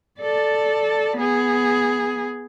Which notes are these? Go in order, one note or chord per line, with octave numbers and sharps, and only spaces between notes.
A4 D5
B3 G#4